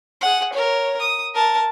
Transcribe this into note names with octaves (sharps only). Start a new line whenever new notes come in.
G#4 F#5
A#4 C#5
D#6
A#4 A5